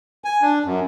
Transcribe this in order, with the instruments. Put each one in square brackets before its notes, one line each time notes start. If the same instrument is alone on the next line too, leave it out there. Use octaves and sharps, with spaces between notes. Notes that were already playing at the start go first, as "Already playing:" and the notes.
[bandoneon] G#5
D4
F#2